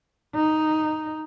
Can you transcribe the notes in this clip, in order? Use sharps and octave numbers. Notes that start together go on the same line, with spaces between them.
D#4